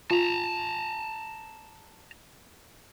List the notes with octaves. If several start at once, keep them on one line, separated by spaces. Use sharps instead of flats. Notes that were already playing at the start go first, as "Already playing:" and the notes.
F4 A5 A#5